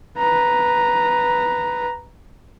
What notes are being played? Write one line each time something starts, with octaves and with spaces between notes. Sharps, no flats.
B4 A#5